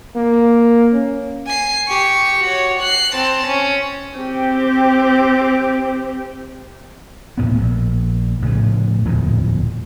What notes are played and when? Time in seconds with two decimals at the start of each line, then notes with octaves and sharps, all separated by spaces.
0.16 A#3
0.93 C#4
1.46 G#5 C7
1.88 G4 C#6
2.44 F#4 C#5
2.80 F#6 C7
3.15 C4 A5
3.47 C#4
4.17 C4 G4
7.38 E1 D2 A2 B3
7.58 A#1
8.42 A2 C#3 F3
9.05 D1 E2 A#2 F3